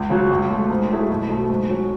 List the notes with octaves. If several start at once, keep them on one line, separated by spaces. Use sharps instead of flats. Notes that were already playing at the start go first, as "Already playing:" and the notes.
Already playing: C#2
C#3 F#3
C#2
B2 A3
G#2
F#3 A3 E4 G#4
B1
B2 A3
G#2
F#3 C#4